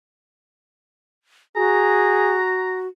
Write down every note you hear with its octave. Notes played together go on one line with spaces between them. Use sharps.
F#4 G#4 A#5